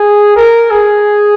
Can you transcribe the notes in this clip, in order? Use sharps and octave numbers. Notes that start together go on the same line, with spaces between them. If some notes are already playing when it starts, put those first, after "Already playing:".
Already playing: G#4
A#4
G#4